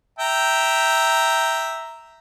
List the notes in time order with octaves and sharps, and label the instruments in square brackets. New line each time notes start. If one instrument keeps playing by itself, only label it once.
[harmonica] E5 G5 A#5